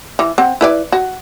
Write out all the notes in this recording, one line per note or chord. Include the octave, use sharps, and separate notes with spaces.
E3
C4 F#5
E4 B4 D5
F#4